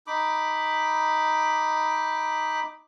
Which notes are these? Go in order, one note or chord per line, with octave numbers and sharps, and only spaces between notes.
D#4 B5 D6